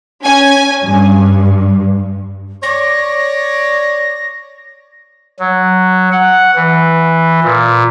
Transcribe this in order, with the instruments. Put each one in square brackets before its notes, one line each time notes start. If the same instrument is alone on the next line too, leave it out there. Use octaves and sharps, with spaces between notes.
[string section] C#4 G#5
G2
[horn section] C#5 D5 [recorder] A#6
[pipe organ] F#3
F#5
E3
A#2